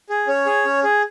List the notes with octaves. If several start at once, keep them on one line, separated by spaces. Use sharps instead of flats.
G#4
C#4 C#5
G#4
C#4
G#4